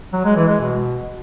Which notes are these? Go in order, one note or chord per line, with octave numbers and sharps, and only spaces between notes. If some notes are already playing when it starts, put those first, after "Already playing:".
F#3
G#3
E3
G#3
B2